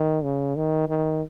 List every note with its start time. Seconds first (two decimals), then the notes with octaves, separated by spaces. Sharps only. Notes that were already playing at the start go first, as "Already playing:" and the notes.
Already playing: D#3
0.23 C#3
0.56 D#3
0.88 D#3